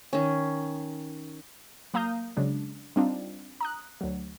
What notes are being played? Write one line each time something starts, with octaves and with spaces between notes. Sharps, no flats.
D#3 C#4
F#3 A#3 F5 A#5 D#6 G6
C#3 F#3 G#3 D4
G3 C4 D4 D#4 F4
A#5 D#6 F#6
D2 F#3